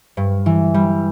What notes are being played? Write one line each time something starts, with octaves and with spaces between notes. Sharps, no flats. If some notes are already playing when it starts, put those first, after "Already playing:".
G2
E3
G3